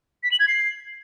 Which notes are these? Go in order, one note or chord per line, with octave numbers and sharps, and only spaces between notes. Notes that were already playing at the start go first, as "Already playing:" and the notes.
B6
F#7
G#6
C7